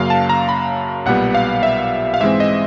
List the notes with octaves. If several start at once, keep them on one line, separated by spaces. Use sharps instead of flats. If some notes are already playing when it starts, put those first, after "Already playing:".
Already playing: F#2 C#3 F#3 A#3 F5
A5
A#5
B5
B1 A#2 G3 B3 F#5
F5
E5
F5
G#2 E3 G#3 C4 E5
D#5